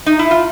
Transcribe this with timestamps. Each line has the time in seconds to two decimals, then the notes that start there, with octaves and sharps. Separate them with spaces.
0.06 D#4
0.19 E4
0.31 F4